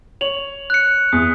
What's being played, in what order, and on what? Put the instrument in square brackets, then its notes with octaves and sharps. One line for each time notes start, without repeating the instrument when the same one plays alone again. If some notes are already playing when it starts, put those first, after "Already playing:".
[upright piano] C#5 [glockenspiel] F7 F#7
[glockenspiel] F#6 C#7
[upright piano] E2 [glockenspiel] D#6